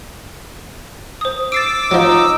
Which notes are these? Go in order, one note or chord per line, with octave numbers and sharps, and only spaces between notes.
C5 D#6
D6 E6 A6 C7 D7
F3 F#3 D#4